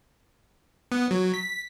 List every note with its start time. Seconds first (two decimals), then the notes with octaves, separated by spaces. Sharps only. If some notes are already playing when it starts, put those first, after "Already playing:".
0.92 B3
1.11 F#3
1.34 B6